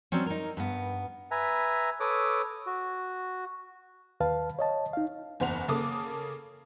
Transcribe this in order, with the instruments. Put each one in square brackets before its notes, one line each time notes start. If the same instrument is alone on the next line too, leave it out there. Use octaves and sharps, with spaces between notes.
[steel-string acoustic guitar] F#3 G3 C4 C#4
D#4 A#4
G2 B3
[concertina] B4 E5 G#5 A#5
A4 B4 C#5 D6 D#6
F#4
[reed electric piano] D#2 B4 F5 A5
C#5 D#5 A5
D#4 F5
[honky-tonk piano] F#1 E2 C5 F#5 F7
C#3 A#3 A4 D6 D#6